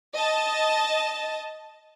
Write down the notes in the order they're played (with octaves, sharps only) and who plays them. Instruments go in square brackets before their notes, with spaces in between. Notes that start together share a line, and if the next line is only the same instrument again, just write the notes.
[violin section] D#5 A5